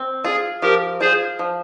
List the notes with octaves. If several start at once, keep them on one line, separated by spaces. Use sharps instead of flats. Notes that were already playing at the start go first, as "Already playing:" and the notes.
Already playing: C4
F4 G#4
F3 G4 A#4
F4 G#4 C5
F3